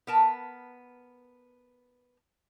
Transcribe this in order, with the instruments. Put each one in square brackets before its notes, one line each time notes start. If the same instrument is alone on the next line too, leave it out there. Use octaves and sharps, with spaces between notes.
[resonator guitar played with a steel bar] B3 A#4 A5